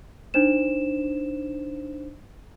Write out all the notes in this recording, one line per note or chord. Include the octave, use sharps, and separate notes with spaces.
D4 D#4 C5 E7